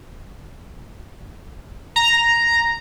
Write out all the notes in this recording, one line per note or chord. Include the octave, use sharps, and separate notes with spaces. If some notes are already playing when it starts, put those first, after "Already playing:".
A#5